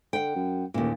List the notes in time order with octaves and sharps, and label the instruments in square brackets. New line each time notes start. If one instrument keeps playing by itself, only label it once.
[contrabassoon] D3 [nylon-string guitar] F#5 G5
[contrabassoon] F#2
[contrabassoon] A1 [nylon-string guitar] D#2 A#2